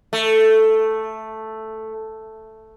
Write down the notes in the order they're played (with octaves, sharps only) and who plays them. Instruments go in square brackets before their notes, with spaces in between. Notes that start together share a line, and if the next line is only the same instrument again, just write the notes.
[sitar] A3